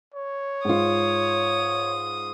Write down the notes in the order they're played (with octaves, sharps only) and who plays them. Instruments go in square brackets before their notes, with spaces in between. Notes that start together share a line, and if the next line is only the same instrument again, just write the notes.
[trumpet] C#5
[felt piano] G#2 F4 [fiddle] D#6